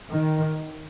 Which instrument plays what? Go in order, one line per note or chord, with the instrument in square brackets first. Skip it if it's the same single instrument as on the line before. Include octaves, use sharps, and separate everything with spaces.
[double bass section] D#3